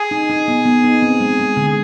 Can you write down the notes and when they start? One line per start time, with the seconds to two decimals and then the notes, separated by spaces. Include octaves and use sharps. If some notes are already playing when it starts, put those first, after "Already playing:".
Already playing: G#4
0.11 D#4
0.30 D#4
0.48 B3
0.65 B3
0.84 D#4
1.02 C4
1.20 G#3
1.40 G#3
1.57 D3